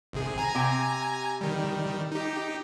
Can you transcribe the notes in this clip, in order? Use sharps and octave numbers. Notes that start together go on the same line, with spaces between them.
G#1 C3 G#4
G#5 A#5 G#6
C3 G5
D#3 G3
D#4 G4